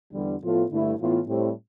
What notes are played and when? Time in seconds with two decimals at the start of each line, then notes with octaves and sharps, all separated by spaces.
0.13 E2 D3 G3
0.41 A2 F3 B3 F4 A4
0.70 G2 D3 A3 E4
0.98 A2 E3 B3 F4
1.26 A2 G3 C4